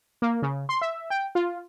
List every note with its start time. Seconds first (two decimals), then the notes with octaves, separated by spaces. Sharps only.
0.22 A#3
0.42 C#3
0.69 C6
0.82 E5
1.10 G5
1.35 F4